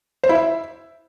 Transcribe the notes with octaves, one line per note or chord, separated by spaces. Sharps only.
C5
E4
E5